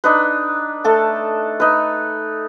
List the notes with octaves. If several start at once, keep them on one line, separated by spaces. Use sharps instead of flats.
D4 D#4 B4
A3 A4 A5
D#4 B4